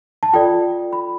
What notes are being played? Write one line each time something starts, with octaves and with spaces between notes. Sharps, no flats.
A5
F4 A4 D5 G5
B5